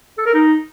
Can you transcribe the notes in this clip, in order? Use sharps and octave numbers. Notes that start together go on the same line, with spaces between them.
A4
A#4
D#4